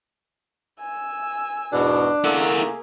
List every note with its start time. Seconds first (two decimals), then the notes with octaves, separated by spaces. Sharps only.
0.80 G#5 E6
1.72 E2 G#2 B2 D4
2.24 C#3 A3 A#3 E4 G#4 A#4 F#5